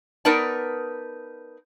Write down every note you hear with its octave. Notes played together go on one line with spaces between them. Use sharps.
B3 D#4 A#4 B4 D5 A5